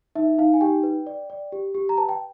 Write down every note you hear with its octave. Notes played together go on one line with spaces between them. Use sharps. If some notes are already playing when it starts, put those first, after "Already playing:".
D#4 E5
D#4 F5
G#5
G4 G5
B4
D5
D5
G4
G4
A#5
B4 A5
G5